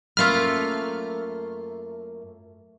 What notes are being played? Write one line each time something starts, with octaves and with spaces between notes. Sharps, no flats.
F#2 A3 A#3 F4 B4 F6